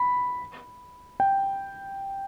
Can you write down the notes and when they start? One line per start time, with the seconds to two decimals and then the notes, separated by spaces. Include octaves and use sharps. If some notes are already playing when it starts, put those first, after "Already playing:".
Already playing: B5
1.20 G5